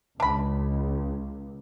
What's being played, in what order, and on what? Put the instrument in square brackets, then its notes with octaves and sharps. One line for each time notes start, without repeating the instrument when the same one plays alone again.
[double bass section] C#2 [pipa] D4 B5